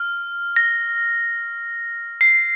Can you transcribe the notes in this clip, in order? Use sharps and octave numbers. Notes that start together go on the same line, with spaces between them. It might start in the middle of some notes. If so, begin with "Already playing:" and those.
Already playing: F6
A#6
C7